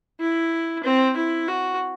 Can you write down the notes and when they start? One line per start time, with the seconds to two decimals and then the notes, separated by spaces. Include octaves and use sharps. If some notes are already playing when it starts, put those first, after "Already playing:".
0.21 E4
0.84 C4
1.17 E4
1.48 F#4